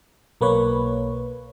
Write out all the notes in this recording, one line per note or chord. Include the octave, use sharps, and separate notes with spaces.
B1 A#3 B4 C#5